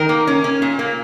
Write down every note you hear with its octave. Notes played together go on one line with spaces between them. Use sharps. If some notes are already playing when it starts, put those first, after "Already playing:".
Already playing: D#3 A#4
A#3
C#4
C#4
A#2
A#3